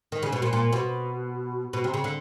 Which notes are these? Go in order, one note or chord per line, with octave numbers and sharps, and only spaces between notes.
D#3
C#3
B2
A#2
A#2
B2
B2
C3
C#3
D3